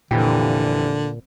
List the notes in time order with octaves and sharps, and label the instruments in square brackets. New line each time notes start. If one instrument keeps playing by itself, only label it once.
[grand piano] F1 E3 G4 [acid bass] A#2 [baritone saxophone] D3